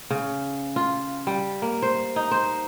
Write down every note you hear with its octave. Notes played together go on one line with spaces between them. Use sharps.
C#3
F4
G3
A#3
C5
D#4
C5